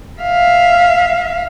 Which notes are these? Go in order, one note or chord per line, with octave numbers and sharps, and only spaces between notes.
E5 F5